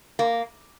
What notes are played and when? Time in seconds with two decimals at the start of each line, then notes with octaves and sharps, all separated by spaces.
0.19 A#3